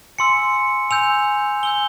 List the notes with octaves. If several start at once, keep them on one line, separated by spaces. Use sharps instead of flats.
G#5 C6 E6 C#7
G#5 E6 G6 F7
G#5 E6 G6 G7